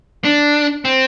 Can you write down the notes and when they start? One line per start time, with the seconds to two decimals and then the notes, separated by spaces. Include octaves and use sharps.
0.24 D4
0.85 C4